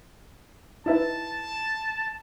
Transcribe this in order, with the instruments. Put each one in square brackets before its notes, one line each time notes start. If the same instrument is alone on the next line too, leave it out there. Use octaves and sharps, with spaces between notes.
[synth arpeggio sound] D#4 E4 B4 [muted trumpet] A5